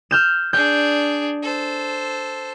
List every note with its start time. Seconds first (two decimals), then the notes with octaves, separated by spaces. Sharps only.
0.11 F6 G6 E7
0.53 D4 G#4 G6
1.43 A4 C5